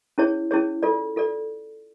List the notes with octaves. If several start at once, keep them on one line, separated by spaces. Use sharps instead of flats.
C#4 E4 G#4 C#5
C#4 E4 G#4 C#5
F4 A4 D5
F4 A4 D5